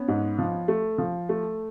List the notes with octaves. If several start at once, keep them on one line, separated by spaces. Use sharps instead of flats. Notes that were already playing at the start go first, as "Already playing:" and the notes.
Already playing: B3 C#4
G#2
F3
A3
F3
A3